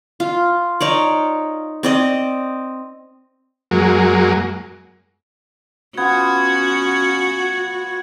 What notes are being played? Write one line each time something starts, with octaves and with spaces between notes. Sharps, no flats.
F4
D#4 C#5 D5
C4 D5 D#5
F#2 F#3 G#3 A#3
B3 C#4 F4 F#4 G#6